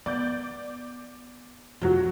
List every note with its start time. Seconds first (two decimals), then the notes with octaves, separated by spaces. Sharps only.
0.06 B3 D5 D6 G6
1.81 F2 D#3 F3 F#3 F#4